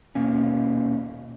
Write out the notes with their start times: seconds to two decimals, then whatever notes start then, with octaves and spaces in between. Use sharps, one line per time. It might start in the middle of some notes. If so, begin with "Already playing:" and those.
0.15 D#1 B2 A#3 C#4